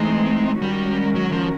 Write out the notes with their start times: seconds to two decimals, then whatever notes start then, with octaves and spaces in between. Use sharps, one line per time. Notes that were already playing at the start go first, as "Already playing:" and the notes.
Already playing: E3 G#3 A3 C4 D#4
0.62 D#3 G3 G#3 C#4 F#4 A#4
1.15 F#3
1.32 F3